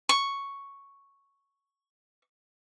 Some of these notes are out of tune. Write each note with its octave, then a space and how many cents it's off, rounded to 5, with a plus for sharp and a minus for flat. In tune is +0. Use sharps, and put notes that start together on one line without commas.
C#6 +0